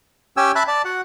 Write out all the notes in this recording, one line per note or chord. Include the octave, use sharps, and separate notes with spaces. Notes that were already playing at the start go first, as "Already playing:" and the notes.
C#4 G4 G5 G#5 E6
E5 A5 B5 F#6
D5 A5
F#4 F#5